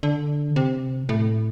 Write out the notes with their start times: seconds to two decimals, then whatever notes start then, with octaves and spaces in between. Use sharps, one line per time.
0.03 D3
0.56 C3
1.09 A2